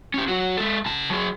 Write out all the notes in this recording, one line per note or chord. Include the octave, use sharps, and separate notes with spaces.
C#4 G4
F#3 F#4
G#3 A4
C#3 A5
F#3 G#4